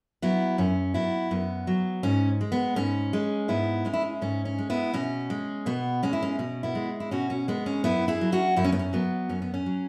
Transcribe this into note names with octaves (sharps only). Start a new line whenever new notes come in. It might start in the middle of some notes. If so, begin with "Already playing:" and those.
F#3 B3 E4
F#2 C#4
F#3 B3 E4
F#2 B3
F#3
G#2 C#4
G#3
B3
G#2 C#4
G#3
G#2 B3 E4
G#3 C#4
E4
C#4
G#2 C#4
C#4
G#3
B3 E4
B2 C#4
G#3
B2 B3
G#3 C#4
E4
C#4
B2 C#4
B3 E4
G#3
E4
B2 C#4 F#4
C#4
G#3 B3
C#4
F#2 B3 E4
E4 G#4
F#3
C#4 F#4
F#2 E4
C#4
B3
C#4
F#3 B3
F#2 C#4
B3
C#4
F#3